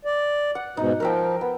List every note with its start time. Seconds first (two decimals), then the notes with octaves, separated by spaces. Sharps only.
0.05 D5
0.55 F#5
0.77 G#2 B2 D#4
1.00 F3 A#4 E5 G5
1.41 B3